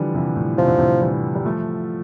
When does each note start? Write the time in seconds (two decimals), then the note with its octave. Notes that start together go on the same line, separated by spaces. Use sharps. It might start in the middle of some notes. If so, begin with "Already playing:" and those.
Already playing: D3 E3 F3 G3
0.14 C3 E3
0.36 A2
0.58 C3 F3
0.67 D3
0.78 A2 C3
1.01 E3 G3
1.35 G3
1.45 F3 A3